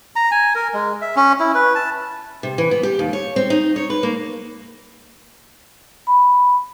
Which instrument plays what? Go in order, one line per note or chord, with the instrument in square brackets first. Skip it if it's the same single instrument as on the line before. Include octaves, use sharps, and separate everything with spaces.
[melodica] A#5
G#5
A#4
G#3
E5
C#4
E4
B4
A5
[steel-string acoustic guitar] C3
E3
B3
G4
D#2
C#5
C4
D#4
C#5
B4
A#3
[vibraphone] B5